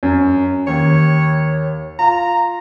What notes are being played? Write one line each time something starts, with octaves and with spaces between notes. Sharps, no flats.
F#2
D#2 C#5
F4 A#5